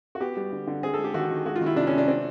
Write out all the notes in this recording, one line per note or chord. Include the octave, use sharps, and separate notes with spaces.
F#4
B3 G4
G3
D3
D3
C4 G#4
A4
G#3
G4
D#3 F#4
D#3
G#3 F#4
F4
D#3
E4
C3 D4
C#4
C3
D4
C4 D4